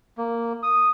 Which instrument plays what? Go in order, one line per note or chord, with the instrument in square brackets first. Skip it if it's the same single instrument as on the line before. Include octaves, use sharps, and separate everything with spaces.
[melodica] A#3
D#6